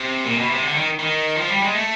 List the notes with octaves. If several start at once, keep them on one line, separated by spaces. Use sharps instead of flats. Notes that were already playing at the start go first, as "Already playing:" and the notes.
Already playing: C3
A#2
B2
C3
D3
D#3
D#3
F3
G3
G#3
A3